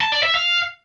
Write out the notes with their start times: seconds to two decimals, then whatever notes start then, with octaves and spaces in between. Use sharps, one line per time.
0.01 A5
0.12 D5
0.23 E5
0.34 F5